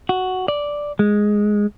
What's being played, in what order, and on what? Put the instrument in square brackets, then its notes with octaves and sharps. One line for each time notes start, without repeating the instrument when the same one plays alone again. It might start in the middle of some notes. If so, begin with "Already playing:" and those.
[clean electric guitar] F#4
D5
G#3